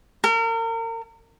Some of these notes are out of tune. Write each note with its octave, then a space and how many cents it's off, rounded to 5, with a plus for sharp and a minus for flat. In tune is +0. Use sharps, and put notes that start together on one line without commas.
A#4 -35